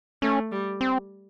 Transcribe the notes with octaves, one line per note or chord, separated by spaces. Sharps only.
A3 C#4
G3
C4